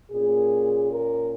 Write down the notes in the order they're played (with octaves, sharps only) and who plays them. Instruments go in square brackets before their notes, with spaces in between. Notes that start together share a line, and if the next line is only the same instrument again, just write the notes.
[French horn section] A#2 A#3 C#4 G#4
A#4